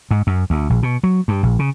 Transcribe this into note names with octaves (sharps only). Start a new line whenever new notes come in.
G#2
F#2
D2
A#1
B2
F#3
G2
A#1
C#3